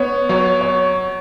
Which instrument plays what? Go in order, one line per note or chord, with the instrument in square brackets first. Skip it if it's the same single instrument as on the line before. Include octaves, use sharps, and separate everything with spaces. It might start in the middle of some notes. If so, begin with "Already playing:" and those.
Already playing: [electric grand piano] B3 [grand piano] C#5
[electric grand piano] F#3 [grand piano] C#5
[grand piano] C#5